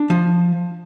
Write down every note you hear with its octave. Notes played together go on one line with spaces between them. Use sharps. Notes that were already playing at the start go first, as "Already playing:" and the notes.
Already playing: D4
F3 A5